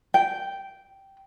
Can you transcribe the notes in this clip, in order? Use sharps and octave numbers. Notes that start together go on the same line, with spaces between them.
G5